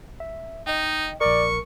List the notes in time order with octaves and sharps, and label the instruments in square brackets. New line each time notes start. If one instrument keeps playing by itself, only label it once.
[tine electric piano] E5
[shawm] D#4 [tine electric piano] D#5 G5
[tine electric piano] A#1 A#4 [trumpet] D5 [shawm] C#6